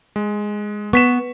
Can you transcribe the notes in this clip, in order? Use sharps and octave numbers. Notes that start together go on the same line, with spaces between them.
G#3
B3 C#6 B6 E7